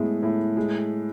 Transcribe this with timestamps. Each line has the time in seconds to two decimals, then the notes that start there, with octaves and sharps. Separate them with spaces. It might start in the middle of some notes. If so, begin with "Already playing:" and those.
Already playing: A2 G#3 B3
0.23 A2
0.57 G#3